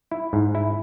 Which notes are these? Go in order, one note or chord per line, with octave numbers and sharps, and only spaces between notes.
E4
G#2
E4